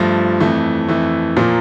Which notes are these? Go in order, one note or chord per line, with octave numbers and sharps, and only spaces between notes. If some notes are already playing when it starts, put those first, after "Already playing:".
Already playing: G2 F3 A3 A#6
F2 E3 A3
F2 E3 A3
A#2 F3 A#3